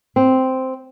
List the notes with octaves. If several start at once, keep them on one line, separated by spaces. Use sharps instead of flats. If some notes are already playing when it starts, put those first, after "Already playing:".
C4